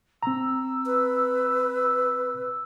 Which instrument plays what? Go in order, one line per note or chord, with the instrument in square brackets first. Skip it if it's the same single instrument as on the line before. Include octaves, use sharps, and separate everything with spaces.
[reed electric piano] C4 A#5 [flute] E6
[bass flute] B4